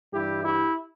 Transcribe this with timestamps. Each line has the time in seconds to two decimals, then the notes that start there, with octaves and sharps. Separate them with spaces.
0.13 G2 E3 G3 E4 G4
0.44 E4 G4